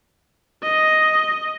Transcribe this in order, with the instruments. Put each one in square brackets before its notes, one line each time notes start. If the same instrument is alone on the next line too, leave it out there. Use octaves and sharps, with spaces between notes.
[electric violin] D#5